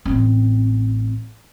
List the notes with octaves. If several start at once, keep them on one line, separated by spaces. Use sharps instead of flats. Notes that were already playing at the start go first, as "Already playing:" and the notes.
A1 C4